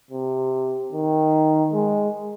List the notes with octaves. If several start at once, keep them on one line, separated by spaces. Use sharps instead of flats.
C3
D#3
G#3